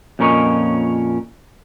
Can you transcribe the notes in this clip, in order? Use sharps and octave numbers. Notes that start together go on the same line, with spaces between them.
F2 A#2 C#4 A#4 C#5 D#5